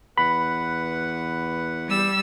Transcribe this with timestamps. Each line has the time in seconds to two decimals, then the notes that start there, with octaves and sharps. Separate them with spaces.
0.18 E2 B4 F#5 B5
1.88 G3 E6